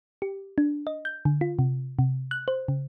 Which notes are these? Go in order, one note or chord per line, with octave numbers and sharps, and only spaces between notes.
G4
D4
D#5
G6
D3
F4
C3
C3
F#6
C5
C#3